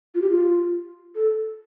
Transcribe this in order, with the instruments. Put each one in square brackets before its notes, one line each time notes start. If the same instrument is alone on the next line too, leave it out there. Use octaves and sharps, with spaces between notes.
[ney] F4
G4
F4
A4